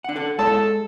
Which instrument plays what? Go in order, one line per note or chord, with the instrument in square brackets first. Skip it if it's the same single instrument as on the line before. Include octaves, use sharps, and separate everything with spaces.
[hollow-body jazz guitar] D4 F#5
A4 F#5
[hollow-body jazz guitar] G#3 [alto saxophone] A4 [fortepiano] A5